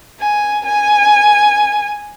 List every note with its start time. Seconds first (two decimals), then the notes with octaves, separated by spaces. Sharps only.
0.20 G#5
0.65 G#5